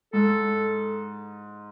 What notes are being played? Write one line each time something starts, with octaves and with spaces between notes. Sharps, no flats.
G#2 A4